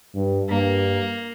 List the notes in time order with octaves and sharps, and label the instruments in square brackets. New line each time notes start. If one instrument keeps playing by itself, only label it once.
[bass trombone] G2
[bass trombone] G2 [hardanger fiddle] A#3